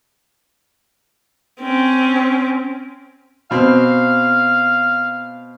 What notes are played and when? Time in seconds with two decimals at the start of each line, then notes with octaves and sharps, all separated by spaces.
1.60 C4 C#4
3.51 B2 C4 F5